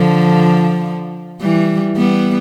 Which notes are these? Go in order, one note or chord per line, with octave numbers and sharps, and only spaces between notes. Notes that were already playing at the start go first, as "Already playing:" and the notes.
Already playing: D3 F3
E3 G3
G3 B3